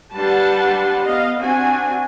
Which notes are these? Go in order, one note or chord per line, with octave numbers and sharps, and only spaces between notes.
G3 D4 B4 F#5 A5 C6
B3 D#5 F5
C4 D4 F#4 G#5